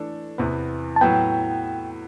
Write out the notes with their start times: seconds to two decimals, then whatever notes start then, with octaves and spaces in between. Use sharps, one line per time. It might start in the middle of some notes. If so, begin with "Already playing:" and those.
Already playing: E3 A3 D4 A4
0.38 E2 C3 E3 B3
0.96 A5
1.01 A2 F#3 B3 G5